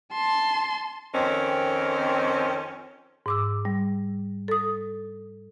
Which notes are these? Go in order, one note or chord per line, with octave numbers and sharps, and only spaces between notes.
A5 C6
F2 D#3 C4 C#4
G#2 D6 E6
G3
A4 D#6